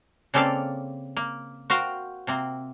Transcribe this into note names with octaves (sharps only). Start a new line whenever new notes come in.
C#3 A#3 C4 A4 D5 F5
A#3
F#4 A#4 C5 F5 G5
C3 A#3 C4